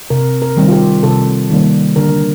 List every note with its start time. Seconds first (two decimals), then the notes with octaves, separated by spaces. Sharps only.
0.10 C3 A#4
0.42 A#4
0.56 D#3 G3 C4
0.68 F4
0.72 G4
1.03 C3 A4
1.50 D#3 G3 A#3
1.96 D3 A#4